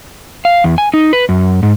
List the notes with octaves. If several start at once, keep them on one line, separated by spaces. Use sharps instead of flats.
F5
E2
G#5
D#4
B4
F#2
G#2